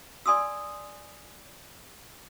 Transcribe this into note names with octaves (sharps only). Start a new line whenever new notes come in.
D5 G#5 C6 D#6 E6